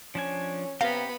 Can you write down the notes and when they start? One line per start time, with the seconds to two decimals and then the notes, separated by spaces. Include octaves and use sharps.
0.15 F3 C#4 D4 G#5
0.81 C3 B3 C#4 G4 F5 A#5 B5